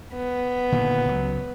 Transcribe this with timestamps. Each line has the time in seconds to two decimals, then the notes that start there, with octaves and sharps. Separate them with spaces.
0.14 B3
0.72 A#2 D3 D#3
1.05 C#2 F#3